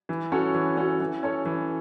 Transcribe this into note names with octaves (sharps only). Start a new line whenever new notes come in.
E3
C#4 F#4 A4 C#5
E3
C#4 F#4 A4 C#5
E3
C#4 A4 C#5
E3